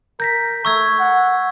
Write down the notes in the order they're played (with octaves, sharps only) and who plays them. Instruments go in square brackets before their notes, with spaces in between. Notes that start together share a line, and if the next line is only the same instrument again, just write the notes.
[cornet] A#4 [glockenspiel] G6 A#6 B6
[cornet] A3 [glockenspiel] C#6 E6 G#6
[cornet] F#5